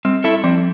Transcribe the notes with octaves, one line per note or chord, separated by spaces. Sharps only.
G3 C4
E4 A4 E5
F3 C4